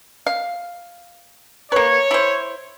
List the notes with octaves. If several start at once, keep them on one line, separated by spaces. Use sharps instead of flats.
F5
A#3 B4 C#5
E4 C5